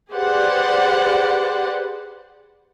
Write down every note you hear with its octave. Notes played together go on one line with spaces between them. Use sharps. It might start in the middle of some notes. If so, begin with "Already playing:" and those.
G4 G#4 B4 C5 D5 F#5